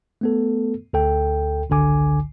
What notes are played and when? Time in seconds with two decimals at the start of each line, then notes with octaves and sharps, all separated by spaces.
0.21 A3 B3 A4
0.93 D2 A4 G5
1.70 G#1 C#2 D3 G#5 D6